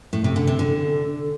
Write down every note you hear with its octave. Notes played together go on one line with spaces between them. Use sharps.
A2
C3
D3
C3
D3